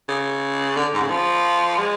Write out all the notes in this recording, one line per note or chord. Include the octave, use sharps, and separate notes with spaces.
C#3
D3
G#2
C#3
F3
G#3